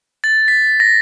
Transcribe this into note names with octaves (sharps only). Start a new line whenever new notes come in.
A6
B6
A#6